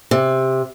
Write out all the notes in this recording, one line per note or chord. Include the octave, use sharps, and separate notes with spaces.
C3